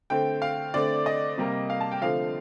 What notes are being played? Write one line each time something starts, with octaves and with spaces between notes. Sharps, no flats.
D3 A3 C4 G5
F5
D3 A3 C4 D5
D#5
C3 G3 A#3
F5
A5
G5
D3 F3 A3 C4 F5